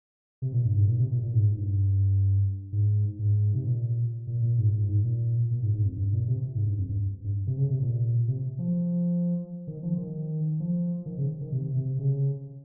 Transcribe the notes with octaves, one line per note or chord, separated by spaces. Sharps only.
C3
A#2
G2
G#2
A#2
C3
A#2
A#2
G#2
G2
G#2
G#2
C3
A#2
A#2
A#2
G#2
G#2
G#2
A#2
A#2
G#2
G#2
F2
G2
A#2
C3
G#2
G2
F2
G2
G2
C3
C#3
C3
A#2
C3
F3
D#3
F3
D#3
F3
D#3
C#3
D#3
C3
C3
C#3